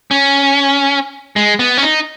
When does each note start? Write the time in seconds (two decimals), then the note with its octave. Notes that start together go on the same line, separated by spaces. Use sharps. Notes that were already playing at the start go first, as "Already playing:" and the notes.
0.11 C#4
1.36 G#3
1.59 B3
1.77 C#4
1.83 D#4